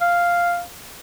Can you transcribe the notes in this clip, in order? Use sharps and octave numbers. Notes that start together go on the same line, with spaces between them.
F5